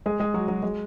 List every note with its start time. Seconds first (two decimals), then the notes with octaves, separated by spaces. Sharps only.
0.06 G#3 G#4
0.20 G#3 G#4
0.34 F#3 F#4
0.48 F#3 F#4
0.63 G#3